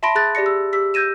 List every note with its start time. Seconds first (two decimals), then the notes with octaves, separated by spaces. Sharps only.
0.03 E5 A5 B5 C6 A#6 D7
0.15 G#4 F#6 A6
0.35 G4 D5 A#6 C#7
0.46 E6
0.73 G4 E6 B6
0.94 E6 G6 G#6 A#6 D#7 E7